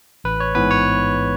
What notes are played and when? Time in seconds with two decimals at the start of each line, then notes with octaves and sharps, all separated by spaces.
0.24 A1 B4
0.40 C#5
0.55 G#2 E3 B3 B4
0.71 C#5